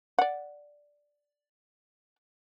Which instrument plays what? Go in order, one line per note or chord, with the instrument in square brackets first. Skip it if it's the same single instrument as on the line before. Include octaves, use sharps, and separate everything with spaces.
[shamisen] D5 F#5